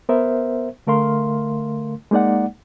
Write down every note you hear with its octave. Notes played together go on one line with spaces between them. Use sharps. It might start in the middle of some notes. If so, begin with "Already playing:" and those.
B3 A#4 C5 E5
D3 A3 A#4 F5 C6
G#3 A#3 D#4 D5 F#5